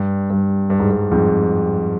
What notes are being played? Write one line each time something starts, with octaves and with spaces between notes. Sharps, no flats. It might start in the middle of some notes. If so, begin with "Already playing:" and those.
Already playing: G2
G2
G2
G#2
G2
F2 G#2